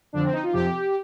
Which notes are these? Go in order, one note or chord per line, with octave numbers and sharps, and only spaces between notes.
F2 D3 F3 D4
C4
D#4
F4
F2 C3 F3 G4